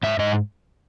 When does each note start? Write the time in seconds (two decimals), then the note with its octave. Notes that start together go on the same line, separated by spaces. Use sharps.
0.03 G#2 E5
0.19 G#2 D#5